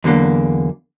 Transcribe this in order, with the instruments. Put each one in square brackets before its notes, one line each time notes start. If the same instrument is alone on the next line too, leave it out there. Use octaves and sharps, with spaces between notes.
[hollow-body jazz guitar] E2 D3 F#3 A#3